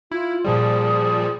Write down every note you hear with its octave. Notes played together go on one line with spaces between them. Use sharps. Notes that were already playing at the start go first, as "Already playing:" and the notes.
E4 F4
A#2 F3 G3 G#4